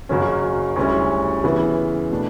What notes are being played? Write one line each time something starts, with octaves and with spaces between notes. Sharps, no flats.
F#1 F#2 C#3 F#3 C#4
D2 C#3 G3 C#4 E4
C#3 E3 B3 E4
B2 A3 D4